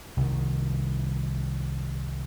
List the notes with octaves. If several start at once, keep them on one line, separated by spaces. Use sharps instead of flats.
C2 D#3